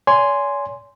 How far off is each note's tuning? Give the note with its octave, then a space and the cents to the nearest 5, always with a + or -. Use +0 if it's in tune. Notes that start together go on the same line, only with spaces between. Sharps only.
C#5 +45 G#5 +0 C6 -5